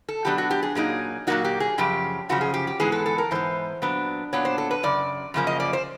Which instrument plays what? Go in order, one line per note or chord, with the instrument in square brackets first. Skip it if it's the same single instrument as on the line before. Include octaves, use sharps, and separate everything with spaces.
[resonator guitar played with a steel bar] A4
B2 F#3 B3 D4 G4
F#4
G4
G#4
A#2 F#3 A#3 D#4 G#4
A#2 F#3 A#3 D#4 F#4
G4
G#4
F#2 C#3 F3 G4
F#2 C#3 F3 F#4
G#4
G4
G4
G#2 E3 G#3 B3 G#4
A4
A4
A#4
G#2 E3 B3 C5
A#2 F#3 B3 D4
A#2 F#3 B3 D4 C#5
C5
A4
B4
F#2 C#3 D5
F#2 C#3 F3 A#3 C#4
D#5
D5
C5